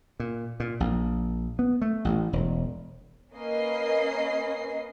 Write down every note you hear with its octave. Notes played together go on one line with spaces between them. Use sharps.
A#2
A#2
A#1
B3
A3
A1
E1
A#3 C#4 A#4 B4 D#5 C7